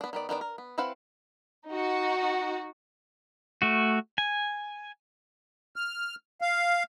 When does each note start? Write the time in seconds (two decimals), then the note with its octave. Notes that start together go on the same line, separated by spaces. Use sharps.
0.01 B3 D4
0.13 D#3 B3 D5
0.29 D#3 B3 D4 D5
0.41 A#4
0.58 B3
0.78 C4 E4 B4 F5 F#5
1.69 D#4 F#4
3.62 A3 F#4
4.18 G#5
5.76 F6
6.41 F5